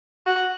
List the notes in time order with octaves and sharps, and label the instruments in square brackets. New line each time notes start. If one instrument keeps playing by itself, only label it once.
[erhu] F#4